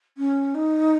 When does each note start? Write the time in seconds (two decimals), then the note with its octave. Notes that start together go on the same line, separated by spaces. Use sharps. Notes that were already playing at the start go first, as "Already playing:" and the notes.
0.17 C#4
0.54 D#4